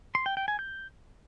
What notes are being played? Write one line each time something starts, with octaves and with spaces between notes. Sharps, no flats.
C6
G5
G5
G#5
G6